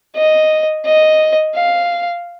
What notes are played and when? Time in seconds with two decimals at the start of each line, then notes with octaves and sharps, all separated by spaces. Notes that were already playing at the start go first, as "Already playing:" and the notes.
0.16 D#5
0.85 D#5
1.56 F5